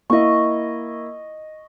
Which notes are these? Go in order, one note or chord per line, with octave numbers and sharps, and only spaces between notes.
A#3 E4 D#5 C#6